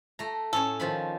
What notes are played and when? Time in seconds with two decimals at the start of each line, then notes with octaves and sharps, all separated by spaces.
0.19 A3 A#5
0.53 A2 C#4 A4 C#5
0.80 D#3 F3 B5